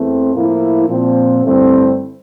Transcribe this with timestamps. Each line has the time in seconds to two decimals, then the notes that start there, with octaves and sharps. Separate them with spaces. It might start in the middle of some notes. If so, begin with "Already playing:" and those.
Already playing: E2 E3 A3 C4
0.33 A2 F3 A#3 E4
0.88 A#2 F3 C4
1.42 G2 D3 A3 C4 E4